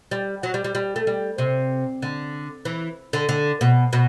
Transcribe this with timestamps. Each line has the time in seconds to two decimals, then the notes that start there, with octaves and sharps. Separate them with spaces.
0.11 G3
0.43 F#3
0.54 G3
0.64 G3
0.75 G3
0.96 A3
1.07 G3
1.38 C3
2.02 D3
2.65 E3
3.13 D3
3.29 D3
3.61 B2
3.93 B2